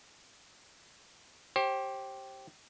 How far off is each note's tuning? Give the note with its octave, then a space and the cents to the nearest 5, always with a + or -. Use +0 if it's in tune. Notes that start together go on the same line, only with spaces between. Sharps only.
G4 -10 C5 +35